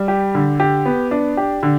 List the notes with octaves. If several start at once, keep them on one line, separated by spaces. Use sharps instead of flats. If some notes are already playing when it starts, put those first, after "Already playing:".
Already playing: G3
G4
D3
G4
B3
D4
G4
D3